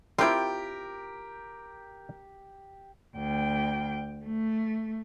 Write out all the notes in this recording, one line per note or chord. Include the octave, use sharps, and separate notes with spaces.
C4 E4 F4 G4 A#4 G5
D2 G5
A3